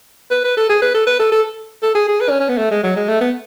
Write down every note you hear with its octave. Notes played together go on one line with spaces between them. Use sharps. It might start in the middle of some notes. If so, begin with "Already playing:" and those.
B4
B4
A4
G#4
B4
A4
B4
A4
A4
A4
G#4
G#4
B4
C#4
C#4
B3
A3
G#3
F#3
G#3
A3
B3